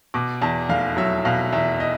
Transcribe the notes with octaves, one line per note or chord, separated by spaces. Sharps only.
B2 D6
E2 A5
F1 F5
F#3 E5
B2 F5
E2 E5
D#5